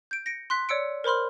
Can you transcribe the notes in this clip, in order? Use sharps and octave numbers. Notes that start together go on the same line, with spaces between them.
G6 D7
A#6 C#7 D7
C6 F#6 B6
C#5 D5 E6 C#7 D7
A#4 C5 B5 C6 F6